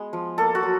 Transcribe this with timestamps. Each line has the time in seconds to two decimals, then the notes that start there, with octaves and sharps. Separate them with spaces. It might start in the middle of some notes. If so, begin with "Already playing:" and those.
Already playing: G#3 B3
0.13 F3
0.38 A#3 A4
0.55 F#4
0.63 F#3